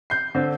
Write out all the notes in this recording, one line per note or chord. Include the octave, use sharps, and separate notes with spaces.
G6 C7
D3 C4